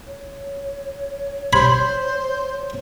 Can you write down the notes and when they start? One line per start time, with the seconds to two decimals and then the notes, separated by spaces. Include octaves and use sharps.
0.07 C#5
1.53 G4 C5 B5 C6 G#6